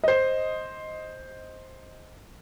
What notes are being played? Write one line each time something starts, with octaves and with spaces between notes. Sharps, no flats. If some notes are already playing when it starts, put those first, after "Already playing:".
C5 D#5